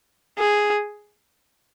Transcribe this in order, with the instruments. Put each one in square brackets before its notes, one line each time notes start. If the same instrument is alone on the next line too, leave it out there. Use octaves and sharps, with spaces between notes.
[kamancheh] G#4